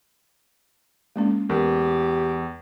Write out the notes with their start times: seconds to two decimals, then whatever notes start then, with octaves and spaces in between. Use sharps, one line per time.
1.16 G#3 A#3 C#4
1.50 E2 G4 A#4